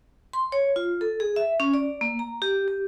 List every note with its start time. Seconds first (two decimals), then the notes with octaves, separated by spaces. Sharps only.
0.33 C6
0.52 C#5
0.76 F4
1.01 A4
1.20 G#4
1.36 E5
1.60 C#4
1.74 D5
2.01 A#3
2.19 A#5
2.42 G4
2.68 G4